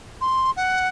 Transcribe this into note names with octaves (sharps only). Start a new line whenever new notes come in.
C6
F#5